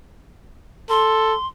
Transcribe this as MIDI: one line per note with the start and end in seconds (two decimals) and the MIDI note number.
0.90 1.34 69
0.90 1.47 84